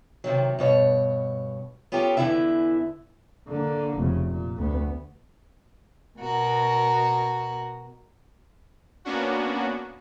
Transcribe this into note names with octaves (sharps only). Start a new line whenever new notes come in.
C3 D#3 F#3
G2 B2 C#5
B3 C#4 F4 G4 A4
E2 B2 D3 E3 E4 E5
D3 A#3
F1 C#3
A#2
D2 B3
B2 F#4 A#4
A#3 B3 C#4 D4 F#4